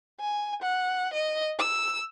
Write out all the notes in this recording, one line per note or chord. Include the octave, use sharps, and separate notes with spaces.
G#5
F#5
D#5
E6